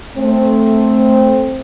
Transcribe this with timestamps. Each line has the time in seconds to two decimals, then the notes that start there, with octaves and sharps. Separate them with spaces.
0.15 A3 C4